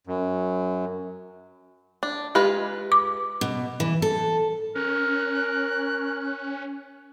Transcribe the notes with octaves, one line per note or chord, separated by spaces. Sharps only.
F#2
D4
G#3 F4 G4 B4
D6
B2
E3
A4
C#4 A#4 F#6